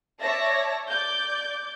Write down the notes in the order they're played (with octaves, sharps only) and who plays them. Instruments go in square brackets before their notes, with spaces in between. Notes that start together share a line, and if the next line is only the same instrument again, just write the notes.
[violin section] C#5 D5 E5 A5 A#6
D5 D6 G6